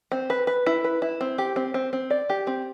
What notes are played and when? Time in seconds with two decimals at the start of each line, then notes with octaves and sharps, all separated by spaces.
0.12 C4
0.30 B4
0.47 B4
0.66 E4
0.84 B4
1.02 E4
1.21 C4
1.38 G4
1.56 C4
1.74 C4
1.93 C4
2.10 D5
2.30 G4
2.47 C4